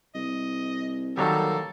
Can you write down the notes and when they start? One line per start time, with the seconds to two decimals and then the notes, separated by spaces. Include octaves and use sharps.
0.15 C2 D#5
1.17 D#3 F#3 G3 A#3 A4